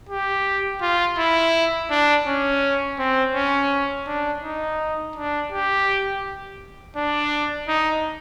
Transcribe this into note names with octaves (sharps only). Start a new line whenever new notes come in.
G4
F4
E4
D4
C#4
C4
C#4
D4
D#4
D4
G4
D4
D#4